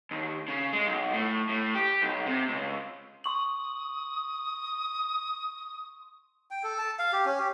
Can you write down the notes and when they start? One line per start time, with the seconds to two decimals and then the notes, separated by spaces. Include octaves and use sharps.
0.11 D#2
0.48 C#3
0.73 G#3
0.86 B1
1.13 A2
1.49 A2
1.75 G4
2.02 B1
2.26 C3
2.48 C#2
3.24 C6 C#6 D#6 F#7
6.51 G5
6.64 A4
6.78 A5
6.99 F5
7.13 G4
7.25 C#4
7.39 G4